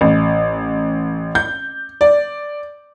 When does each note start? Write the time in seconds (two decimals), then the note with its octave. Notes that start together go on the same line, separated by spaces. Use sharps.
0.01 A1
1.35 G6
2.01 D5